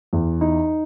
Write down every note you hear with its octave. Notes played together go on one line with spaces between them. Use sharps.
E2
D#4